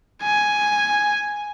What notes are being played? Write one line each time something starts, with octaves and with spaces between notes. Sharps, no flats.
G#5